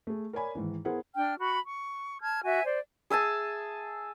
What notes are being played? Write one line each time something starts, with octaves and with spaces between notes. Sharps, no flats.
A3 G#4
A#4 C#5 D5 G#5 B5
G#2 D#3 E3
B3 E4 G#4 A#4 C5 F#5
D4 G5 F6
F#4 B5 C#6
C#6
A5 F6 G#6
F#4 E5 G#5
C5 D5
G#4 E5 G#5 A5